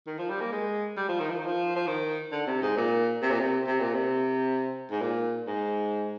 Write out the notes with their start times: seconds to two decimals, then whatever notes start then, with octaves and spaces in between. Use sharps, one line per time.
0.07 D#3
0.18 F3
0.29 G3
0.41 A#3
0.52 G#3
0.97 G3
1.08 F3
1.20 D#3
1.30 F3
1.38 D#3
1.45 F3
1.76 F3
1.87 D#3
2.32 D3
2.47 C3
2.62 G#2
2.77 A#2
3.22 C3
3.31 A#2
3.39 C3
3.67 C3
3.80 A#2
3.94 C3
4.91 G#2
5.02 A#2
5.47 G#2